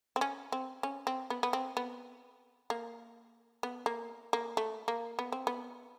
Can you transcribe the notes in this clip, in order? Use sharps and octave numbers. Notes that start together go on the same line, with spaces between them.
C4
C#4
C4
C#4
C4
B3
B3
C4
B3
A#3
B3
A#3
A#3
A3
A#3
B3
C4
B3